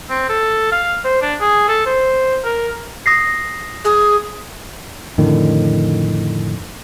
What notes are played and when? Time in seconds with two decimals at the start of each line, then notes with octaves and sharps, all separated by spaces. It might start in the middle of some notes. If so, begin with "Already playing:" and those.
0.10 C4
0.29 A4
0.72 F5
1.04 C5
1.22 D4
1.41 G#4
1.68 A4
1.86 C5
2.44 A#4
3.06 D#6 A#6 C7
3.85 G#4
5.18 F2 A2 D3 D#3